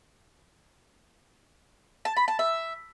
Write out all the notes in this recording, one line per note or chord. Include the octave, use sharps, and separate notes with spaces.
A5
B5
A5
E5